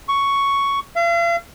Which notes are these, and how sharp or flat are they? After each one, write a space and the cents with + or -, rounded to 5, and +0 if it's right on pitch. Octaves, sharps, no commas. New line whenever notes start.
C#6 +5
F5 -40